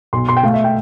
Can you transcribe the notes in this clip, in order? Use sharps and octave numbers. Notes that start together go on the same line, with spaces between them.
B1 C6
B1 C6
G5
A3 F5
E5
G5